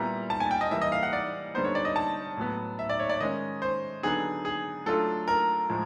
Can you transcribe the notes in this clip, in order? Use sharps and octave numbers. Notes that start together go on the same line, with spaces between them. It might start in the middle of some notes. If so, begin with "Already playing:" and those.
Already playing: A#2 G3 B3 E4 A#5
A5
G#5
G5
D#5
E3 G3 A#3 E5
D#5
F5
F#5
D5
D3 G3 B3 D#4 C5
C#5
D5
D#5
A5
A2 F#3 B3
E5
D5
C#5
D5
D#3 G#3 C#4 D#5
C5
D3 F#3 B3 D#4 G#4
G#4
F#3 A3 D4 F4 A4
A#4
A2 F3 G#3